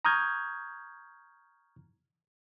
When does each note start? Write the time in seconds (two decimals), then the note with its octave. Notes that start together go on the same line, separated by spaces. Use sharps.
0.05 A#5 C#6 D#6 F6 G6 G#6